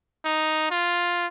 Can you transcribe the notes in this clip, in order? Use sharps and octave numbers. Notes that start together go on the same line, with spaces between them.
D#4
F4